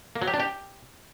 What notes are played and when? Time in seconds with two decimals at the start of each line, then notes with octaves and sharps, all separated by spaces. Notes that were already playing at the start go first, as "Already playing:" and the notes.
0.16 A#3
0.22 F#3
0.28 G4
0.34 D4
0.40 G4